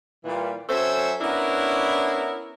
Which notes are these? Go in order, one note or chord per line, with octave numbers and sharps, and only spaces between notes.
A#2 E3 G3
F#3 C#4 A4 C5 E5 G#5
B3 C#4 D4 E4 A#4